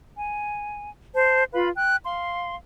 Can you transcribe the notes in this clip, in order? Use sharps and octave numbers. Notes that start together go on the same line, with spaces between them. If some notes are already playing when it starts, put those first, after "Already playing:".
G#5
C5 A5
F4 B4 F5 B5
G5 F#6
F5 C6